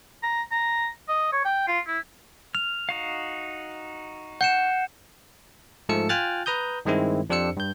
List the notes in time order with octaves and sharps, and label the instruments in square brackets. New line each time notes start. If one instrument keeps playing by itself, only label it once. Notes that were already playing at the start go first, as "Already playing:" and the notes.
[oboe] A#5
A#5
D#5
C#5
G5
F4
E4
[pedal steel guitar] F6 [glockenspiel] F7
[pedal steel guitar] D#4 F#4 F5
[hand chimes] F#5 [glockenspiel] G6 C#7 E7
[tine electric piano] G#2 F3 A3 A4 E6 C#7
F4 G5 G#5 F6 F#6 A6
B4 A#5 D#6 G6
G2 D#3 G#3 C4 E4
F2 D4 G4 C5 E6 C#7
G2 G6